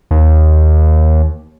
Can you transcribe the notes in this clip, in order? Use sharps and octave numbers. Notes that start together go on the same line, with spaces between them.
D#2